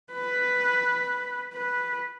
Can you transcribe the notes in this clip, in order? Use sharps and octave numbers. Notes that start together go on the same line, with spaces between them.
B4
B4